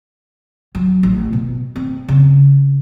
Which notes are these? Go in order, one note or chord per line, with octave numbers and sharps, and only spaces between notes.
F#3
A1
B2
C4
C#3